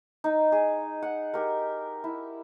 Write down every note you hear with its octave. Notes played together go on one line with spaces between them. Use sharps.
D#4
G#4
F#5
G4 A#4
E4